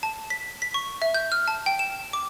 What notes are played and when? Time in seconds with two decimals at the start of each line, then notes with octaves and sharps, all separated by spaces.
0.03 A5
0.30 B6
0.62 B6
0.74 C#6
1.02 E5
1.14 G6
1.32 F6
1.48 A5
1.66 G5
1.79 E7
2.13 D6